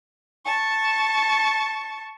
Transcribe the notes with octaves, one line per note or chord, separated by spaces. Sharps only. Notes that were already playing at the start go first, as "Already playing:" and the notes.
A5 C#6